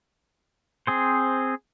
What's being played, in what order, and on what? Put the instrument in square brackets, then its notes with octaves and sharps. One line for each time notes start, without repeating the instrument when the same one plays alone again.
[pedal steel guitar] C4 G#4 C5